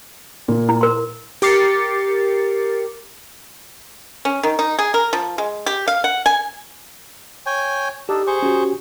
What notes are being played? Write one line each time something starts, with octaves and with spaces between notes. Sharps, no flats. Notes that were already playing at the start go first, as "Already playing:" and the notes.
A#2
E4
A#4 C6
G4 A#4 D6 A6 C7 C#7
C#4
D#3
D#4
G#4
A#4
F3
G#3
G4
F5
F#5
G#5
C#5 G5 G#5
D4 D#4 G4 A4
G#4 C5 C#6
C#4 F#4 G4